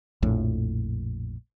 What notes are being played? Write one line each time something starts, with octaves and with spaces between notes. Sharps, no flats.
A#1 F2 A2